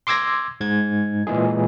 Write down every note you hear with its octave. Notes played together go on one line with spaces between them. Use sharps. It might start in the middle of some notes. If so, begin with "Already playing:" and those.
C6 D6 E6 G#6 A#6
G#2 G#6
A#2 E3 G#3 G#4